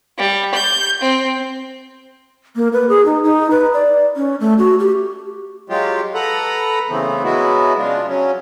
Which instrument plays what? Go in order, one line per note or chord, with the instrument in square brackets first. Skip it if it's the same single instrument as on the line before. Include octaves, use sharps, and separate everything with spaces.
[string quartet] G3
G6
C4
[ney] A#3
B4
G#4
D#4
D#4
B4
D5
C#4
A3
F#4
G4
[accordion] F#3 G#3 F4 G4
A4 B4 F#5 A#5 B5
C#3 E3 A3 B3 C4
F#3 G#3 B3 E4 F#4
C#3 G#3 D4 F4
F#3 C#4